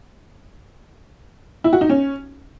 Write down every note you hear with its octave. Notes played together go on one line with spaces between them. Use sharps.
E4
F#4
D#4
C#4